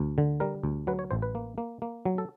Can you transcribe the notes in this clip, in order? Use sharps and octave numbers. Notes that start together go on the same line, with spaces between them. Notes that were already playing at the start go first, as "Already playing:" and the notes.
Already playing: D2
D3
G3 A#4
D2
F#3 B4
C#5
A1 C5
B4
A#3
A#3
A#3
F#3
A4